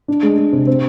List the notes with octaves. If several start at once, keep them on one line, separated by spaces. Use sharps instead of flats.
D4
G#3
G#3
C3
C4